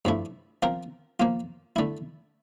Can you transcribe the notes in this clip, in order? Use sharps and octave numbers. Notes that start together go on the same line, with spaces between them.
G2 F3 A3 E4
F3 C4 F4 A#4
F3 A#3 F4
D3 A3 E4